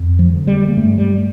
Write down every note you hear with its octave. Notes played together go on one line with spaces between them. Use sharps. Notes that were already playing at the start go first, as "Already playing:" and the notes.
Already playing: F2
F3
D3
G3
A#3
G2 A3
G3